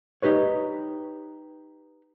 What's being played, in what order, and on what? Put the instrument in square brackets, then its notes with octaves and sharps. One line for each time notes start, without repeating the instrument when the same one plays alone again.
[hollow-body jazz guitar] D#4 G4 B4 C#5